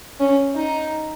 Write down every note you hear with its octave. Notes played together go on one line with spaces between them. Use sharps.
C#4
D#4